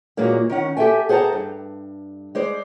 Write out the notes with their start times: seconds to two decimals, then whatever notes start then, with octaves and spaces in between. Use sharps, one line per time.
0.17 A#2 E3 F#3 G#3 A#3
0.49 D#3 C#4 F#5
0.77 G4 A4 A#4 E5 G5 G#5
1.09 G#4 C5 F#5 G5 A5 A#5
1.33 G2
2.35 G#3 C5 D5